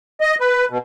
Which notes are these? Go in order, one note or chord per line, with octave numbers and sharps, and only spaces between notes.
D#5
B4
B2